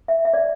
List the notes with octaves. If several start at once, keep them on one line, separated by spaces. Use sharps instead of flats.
E5
E5
D5